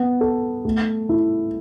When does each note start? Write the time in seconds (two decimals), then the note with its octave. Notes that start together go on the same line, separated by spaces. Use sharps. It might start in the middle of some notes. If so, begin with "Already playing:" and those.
Already playing: B3
0.21 A4
0.65 A3
1.09 E4